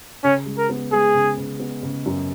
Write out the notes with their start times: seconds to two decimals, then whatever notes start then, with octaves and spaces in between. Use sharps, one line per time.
0.24 C#3 C#4
0.46 G#3
0.58 A#4
0.69 B3
0.92 G#3 G#4
1.15 C#3
1.38 C#3
1.60 B3
1.83 C#3
2.06 F#2